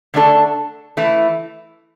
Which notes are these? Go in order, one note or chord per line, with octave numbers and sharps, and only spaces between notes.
D3 A3 D4 A4
E3 A3 E4